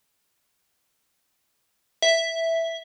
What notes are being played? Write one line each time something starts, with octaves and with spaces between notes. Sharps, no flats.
E5